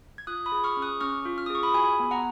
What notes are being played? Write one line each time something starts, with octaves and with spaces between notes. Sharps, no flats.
G#6
F4 D#6 F#6
B5 D#6
G#4
C#6 F6
C#4
D#6 F#6
C#4 C#6 F6
F4
F6
D#6
G#4 C#6
B5 D#6
F#4 G#5 B5
B3
F#5 A#5